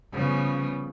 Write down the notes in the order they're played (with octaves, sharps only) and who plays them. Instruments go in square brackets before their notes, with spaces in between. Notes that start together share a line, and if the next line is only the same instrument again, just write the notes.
[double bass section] C#3 [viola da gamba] F3 G3 B3